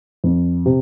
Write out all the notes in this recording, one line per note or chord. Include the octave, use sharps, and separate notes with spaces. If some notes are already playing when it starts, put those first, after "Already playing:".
F2
C3